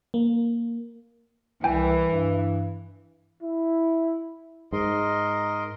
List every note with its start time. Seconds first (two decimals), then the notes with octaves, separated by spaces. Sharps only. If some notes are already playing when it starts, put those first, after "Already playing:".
0.14 A#3
1.64 C2 E3 G5 G#5
2.08 G2
3.43 E4
4.73 G#2 A#4 D#5 C6